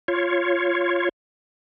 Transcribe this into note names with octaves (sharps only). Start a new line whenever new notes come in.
F4 C#5